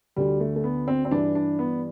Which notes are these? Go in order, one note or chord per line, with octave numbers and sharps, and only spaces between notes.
D2 D3 G3
A3
A3
B3
C4
C4
G2 E3 D4
D4
B3